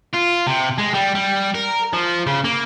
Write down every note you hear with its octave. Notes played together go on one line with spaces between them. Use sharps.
F4
C3
G#3
G3
G3
A#4
F3
C#3
A#3